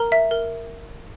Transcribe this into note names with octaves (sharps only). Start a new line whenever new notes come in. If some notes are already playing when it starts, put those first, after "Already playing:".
Already playing: A#4 A#5
E5
A#4